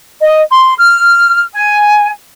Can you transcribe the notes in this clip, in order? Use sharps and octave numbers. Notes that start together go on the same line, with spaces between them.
D#5
C6
F6
G#5